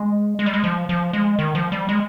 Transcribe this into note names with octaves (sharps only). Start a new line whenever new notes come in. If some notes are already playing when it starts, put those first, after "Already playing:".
Already playing: G#3
G#3
G3
G#3
F3
F3
G#3
D#3
F3
G3
G#3